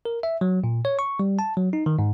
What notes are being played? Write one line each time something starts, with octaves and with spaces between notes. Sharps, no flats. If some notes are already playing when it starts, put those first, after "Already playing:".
A#4
E5
F#3
A#2
C#5
C#6
G3
A5
F#3
D#4
D#3
G#2